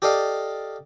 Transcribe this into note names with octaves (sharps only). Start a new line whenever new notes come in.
G4 A4 D5 D#5 F5